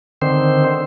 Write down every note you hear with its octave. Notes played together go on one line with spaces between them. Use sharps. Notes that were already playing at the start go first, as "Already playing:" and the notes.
D3 D#3 C4 C5